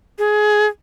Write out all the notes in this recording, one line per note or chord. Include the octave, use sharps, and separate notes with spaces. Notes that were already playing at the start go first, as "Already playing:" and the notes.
G#4